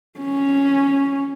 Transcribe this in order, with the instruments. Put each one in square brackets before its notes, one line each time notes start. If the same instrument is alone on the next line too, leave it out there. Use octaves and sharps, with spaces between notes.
[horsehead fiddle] C#4